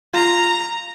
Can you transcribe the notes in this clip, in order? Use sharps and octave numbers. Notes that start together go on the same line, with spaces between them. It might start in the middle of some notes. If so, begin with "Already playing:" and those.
F4 A#5